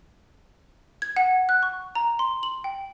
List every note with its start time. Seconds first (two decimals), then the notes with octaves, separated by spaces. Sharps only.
1.02 G#6
1.16 F#5
1.49 F#6
1.63 C#6
1.95 A#5
2.19 C6
2.43 F#7
2.64 G5